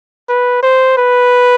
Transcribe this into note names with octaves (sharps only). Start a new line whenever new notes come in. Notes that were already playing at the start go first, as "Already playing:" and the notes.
B4
C5
B4